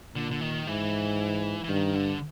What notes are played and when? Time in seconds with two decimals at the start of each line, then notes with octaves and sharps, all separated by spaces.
0.15 A#2 D3
0.31 D3
0.41 D#3
0.66 G#2 E3
1.64 E3
1.69 G2 D#3
1.95 D3